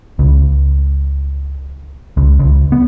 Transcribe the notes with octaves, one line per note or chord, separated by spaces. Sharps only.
C#2
C#2
C#2
B3